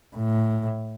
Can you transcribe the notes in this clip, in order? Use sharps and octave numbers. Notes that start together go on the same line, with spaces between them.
A2